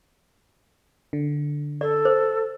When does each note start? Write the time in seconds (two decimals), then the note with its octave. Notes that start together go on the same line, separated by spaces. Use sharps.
1.13 D3
1.81 A4 D5
2.05 C5